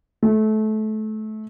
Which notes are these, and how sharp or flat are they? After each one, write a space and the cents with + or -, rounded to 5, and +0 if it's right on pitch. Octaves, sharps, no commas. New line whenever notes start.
A3 -25